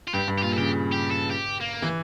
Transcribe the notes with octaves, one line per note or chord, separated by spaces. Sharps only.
F4
G2 G4
G2
G4
A#2 F4
A4
C#3 G4
G4
A4
G4
A#3
E3